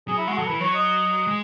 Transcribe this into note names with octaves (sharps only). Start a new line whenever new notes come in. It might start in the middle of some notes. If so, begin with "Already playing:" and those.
F#3 G#4
E4
G#3 F#4
F#3 A4
E3 B4
F#3 C#5
D#5
G#3